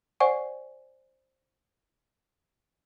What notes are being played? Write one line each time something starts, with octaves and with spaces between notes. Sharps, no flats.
C5 D5 F#5 G#5 C#6